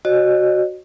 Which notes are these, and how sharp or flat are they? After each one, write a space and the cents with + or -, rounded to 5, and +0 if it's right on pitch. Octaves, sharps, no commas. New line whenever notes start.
F#4 +0 C5 +45 D#5 -45